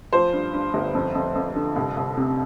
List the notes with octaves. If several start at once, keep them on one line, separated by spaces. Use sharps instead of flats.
F3 C5
G2
G2
G1
F2
F2
F2
D3
C2
C2
C3